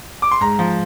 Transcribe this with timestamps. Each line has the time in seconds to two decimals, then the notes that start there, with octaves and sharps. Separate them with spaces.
0.22 D6
0.31 C6
0.41 G#2 A#5
0.59 F3